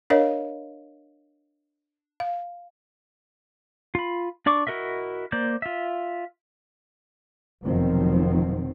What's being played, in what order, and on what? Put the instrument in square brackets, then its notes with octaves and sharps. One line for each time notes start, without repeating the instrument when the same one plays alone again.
[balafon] D4 A#4 C#5 D#5 F5
F5
[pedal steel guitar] F4 B5
D4 D5 C#6 D6
E4 F#4 A#4 D#5 E5
A#3 C5 D5 G6
F4 E5
[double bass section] F1 B2 D#3 F3 F#3 C4